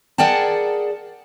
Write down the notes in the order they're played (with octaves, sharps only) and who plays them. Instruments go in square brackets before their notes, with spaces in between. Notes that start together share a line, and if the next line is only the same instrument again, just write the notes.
[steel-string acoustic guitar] G#4 A#4 D5 F#5 G5 A5